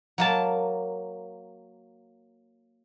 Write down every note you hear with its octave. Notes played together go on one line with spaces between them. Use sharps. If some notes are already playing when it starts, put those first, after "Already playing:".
F#3 A#3 A5